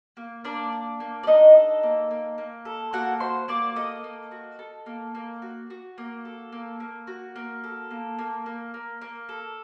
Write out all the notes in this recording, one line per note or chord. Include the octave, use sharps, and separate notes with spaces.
A#3
A#3 D4 D5
D4
A#3
D5
D4 D#4 D#5
A4
A#3
A#3
A#3
A4
A#3 F#4 F#5
F#4 C5 C6
A#3 D5 D6
A4 D#5 D#6
A#3
F#4
A4
A#3
A#3
F#4
F#4
A#3
A4
A#3
A#3
F#4
A#3
A4
A#3
A#3
A#3
A#3
A#3
A4